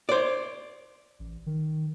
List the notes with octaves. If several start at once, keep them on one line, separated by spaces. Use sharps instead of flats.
C5 D5
A1
D#3